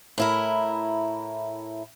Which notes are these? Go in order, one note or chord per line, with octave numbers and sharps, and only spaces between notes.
A2 E4 A#4